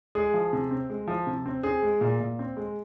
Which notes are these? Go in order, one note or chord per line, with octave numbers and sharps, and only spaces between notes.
G#3 G#4
F3
C3
C4
G#3
F3
C3
C4
C4 G#4
G#3
A#2
A#2
C4
G#3